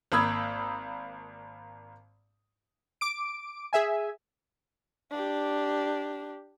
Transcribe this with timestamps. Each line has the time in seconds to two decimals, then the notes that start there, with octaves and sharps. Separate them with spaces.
0.12 G#1 A#3 B5 D#6 E6 G#6
3.01 D6 D7
3.73 G#4 E5 G#5
5.11 D4 G4